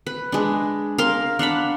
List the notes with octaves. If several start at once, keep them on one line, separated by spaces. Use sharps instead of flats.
B4
G#3 D4
A#4 F5 C6
D4 F5 F#5 B5